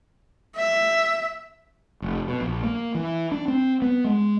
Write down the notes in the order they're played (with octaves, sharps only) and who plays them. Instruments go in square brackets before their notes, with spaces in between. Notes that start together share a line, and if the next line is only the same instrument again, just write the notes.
[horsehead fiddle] E5
[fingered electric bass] F1
B2
A#1
A#3
E3
D4
C4
B3
G#3